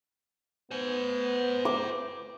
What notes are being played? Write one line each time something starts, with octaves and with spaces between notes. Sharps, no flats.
B3 C5 G#5
D6